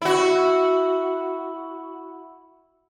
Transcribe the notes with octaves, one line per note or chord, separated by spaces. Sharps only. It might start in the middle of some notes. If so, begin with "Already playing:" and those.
E4 F#4